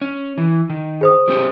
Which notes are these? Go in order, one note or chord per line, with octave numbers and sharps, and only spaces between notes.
C#4
E3
D#3
G#4 C5 D#6
F#3 C4 G4